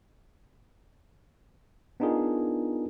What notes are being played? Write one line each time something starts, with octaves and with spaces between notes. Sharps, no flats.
B3 D4 D#4 F4 G#4 A#4